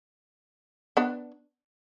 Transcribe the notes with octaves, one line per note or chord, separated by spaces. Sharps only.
B3 D4